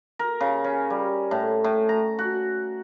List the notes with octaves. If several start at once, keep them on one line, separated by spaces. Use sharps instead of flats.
A#4
C#3
C#4
G3
A2
A2
A#5
F#4